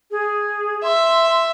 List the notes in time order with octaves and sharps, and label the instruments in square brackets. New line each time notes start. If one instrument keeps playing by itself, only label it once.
[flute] G#4
[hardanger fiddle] E5 [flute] C6